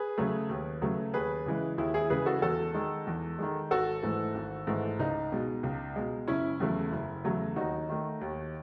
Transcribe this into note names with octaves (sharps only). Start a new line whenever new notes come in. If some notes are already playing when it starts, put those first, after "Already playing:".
Already playing: G#4 B4
C#3 F#3 A3
D#2
C#3 F#3 A3
D#2 G#4 B4
C#3 E3 G#3
D#2 E4 G#4
E4 G#4
C#3 E3 G#3 G#4 B4
F#4 A4
E2 F#4 A4
D#3 G#3
E2
D#3 G#3
G#1 F#4 A4
G#2 E3 A3
G#1
G#2 E3 A3
C#2 D#4
B2 G#3
C#2
B2 G#3
F#1 C#4 E4
E2 C#3 F#3 A3
F#1
E2 C#3 F#3 A3
D#2 D#4 F#4
D#3 A3
D#2